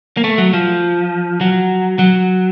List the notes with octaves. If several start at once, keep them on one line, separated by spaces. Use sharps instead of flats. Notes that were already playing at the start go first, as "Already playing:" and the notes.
A#3
A3
F#3
F3
F#3
F#3